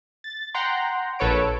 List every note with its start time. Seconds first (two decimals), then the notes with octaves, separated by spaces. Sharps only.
0.24 A6
0.54 F#5 G5 A#5 C6
1.19 A#1 A4 B4 C#5 D7